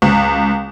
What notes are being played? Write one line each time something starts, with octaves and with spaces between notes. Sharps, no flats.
C#2